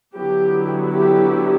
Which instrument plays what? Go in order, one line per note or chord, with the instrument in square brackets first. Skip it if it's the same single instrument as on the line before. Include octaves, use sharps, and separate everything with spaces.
[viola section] D3 F#3 B3 E4 G4
G4